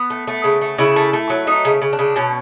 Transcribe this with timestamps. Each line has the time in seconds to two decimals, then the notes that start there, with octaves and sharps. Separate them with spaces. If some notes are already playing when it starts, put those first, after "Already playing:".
Already playing: B3
0.10 A3
0.27 A3
0.44 C#3
0.62 A3
0.78 C#3 E4
0.96 A3
1.13 A3
1.30 F#3
1.47 A3 D#4
1.65 C#3
1.82 C#3
1.93 D4
1.99 C#3
2.16 B2 C#4